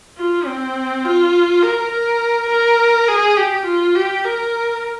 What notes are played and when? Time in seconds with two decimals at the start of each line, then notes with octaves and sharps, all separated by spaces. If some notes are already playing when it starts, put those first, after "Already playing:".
0.17 F4
0.47 C4
1.04 F4
1.62 A#4
1.92 A#4
2.49 A#4
3.08 G#4
3.37 G4
3.66 F4
3.95 G4
4.24 A#4